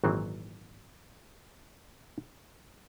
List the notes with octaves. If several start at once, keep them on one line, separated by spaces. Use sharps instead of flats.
G#1 A#2 D#3 E3 F#3 C4